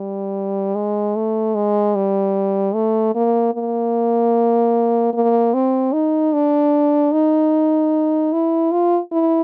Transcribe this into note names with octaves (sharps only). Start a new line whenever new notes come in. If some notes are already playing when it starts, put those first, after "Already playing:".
Already playing: G3
G#3
A3
G#3
G3
A3
A#3
A#3
A#3
C4
D#4
D4
D#4
E4
F4
E4